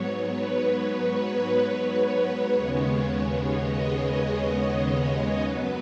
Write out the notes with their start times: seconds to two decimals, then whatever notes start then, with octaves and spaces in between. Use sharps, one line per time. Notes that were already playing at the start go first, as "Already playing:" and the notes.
Already playing: G#2 F#3 B3 C#5
0.36 B4
1.82 C#5
2.54 D#2 C#3 G#3 B3 C#5
3.26 C#5
3.62 D#5
4.71 C#5
5.43 F#2 F#3 B3 B4